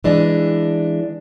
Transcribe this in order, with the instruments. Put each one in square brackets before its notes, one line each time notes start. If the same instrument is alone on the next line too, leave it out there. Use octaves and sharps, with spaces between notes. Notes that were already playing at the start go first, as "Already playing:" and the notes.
[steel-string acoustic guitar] E3 G#3 D4